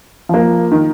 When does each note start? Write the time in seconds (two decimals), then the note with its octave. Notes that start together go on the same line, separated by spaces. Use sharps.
0.29 F3 A#3
0.71 D#3